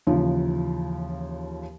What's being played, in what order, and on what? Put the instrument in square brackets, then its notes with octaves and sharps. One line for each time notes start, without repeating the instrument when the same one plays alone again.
[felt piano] D#2 C#3 E3 F3